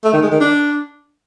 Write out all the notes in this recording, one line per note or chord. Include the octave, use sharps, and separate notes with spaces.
A3
D#3
G#3
D#3
D4